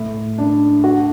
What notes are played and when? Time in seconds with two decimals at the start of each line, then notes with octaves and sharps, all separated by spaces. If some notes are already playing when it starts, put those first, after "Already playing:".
Already playing: A2
0.38 D4
0.84 F#4